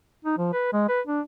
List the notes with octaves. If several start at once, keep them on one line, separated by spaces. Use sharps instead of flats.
D#4
F3
B4
G#3
B4
D4